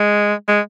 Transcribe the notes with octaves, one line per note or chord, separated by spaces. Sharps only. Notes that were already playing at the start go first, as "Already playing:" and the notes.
Already playing: G#3
G#3